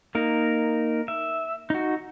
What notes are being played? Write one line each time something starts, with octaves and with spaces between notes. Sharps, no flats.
A#3 D#4 A#4
E5
D#4 F#4